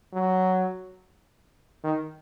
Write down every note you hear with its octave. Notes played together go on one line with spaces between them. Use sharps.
F#3
D#3